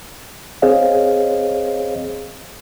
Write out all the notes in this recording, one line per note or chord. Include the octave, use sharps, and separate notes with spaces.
C4 G#4 C5 C#5 D#5 F5